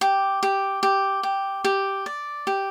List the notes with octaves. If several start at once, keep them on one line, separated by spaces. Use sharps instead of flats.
G4
G4
G4
G4
G4
D5
G4